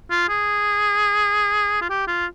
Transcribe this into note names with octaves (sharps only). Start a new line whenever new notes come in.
F4
G#4
F4
G4
F4